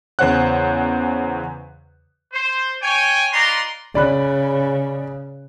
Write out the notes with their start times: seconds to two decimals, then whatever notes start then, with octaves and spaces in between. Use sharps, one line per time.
0.19 E2 C#3 C5 C#5 F#5 F#6
2.33 C5
2.82 C#5 G5 G#5
3.33 D#4 F4 B4 D5 A#5 C6
3.95 C#3 D5 B5 F#6